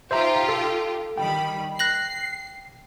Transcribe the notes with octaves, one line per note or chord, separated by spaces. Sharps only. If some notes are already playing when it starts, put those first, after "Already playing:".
D#4 F4 G4 C5 E5 A#5
A4
D#3 G3 G5 B5
F#6 A#6 C7 F#7